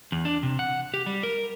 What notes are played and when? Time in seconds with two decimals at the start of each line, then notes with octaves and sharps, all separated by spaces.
0.12 E2
0.25 D4
0.43 C3
0.59 F#5
0.94 G4
1.06 G3
1.23 A#4